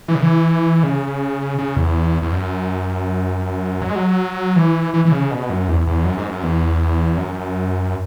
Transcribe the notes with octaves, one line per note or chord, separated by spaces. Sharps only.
E3
C#3
E3
C#3
C#3
E2
E2
F#2
F#3
G#3
F#3
E3
E3
E3
C#3
B2
F#2
E2
E2
F#2
G#2
F#2
E2
F#2